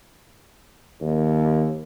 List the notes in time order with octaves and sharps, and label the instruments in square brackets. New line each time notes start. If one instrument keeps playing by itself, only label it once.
[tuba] D#2